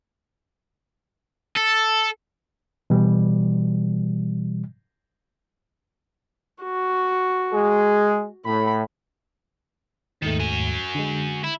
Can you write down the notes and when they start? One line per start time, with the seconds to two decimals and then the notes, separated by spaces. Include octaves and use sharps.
1.57 A4
2.90 B2 E3 G3
6.63 F#4
7.52 G#3 G#4
8.46 A2 B5
10.22 D#2 G#2 D#3 A3
10.39 F#4 G#5
10.95 D3 G#3
11.44 E4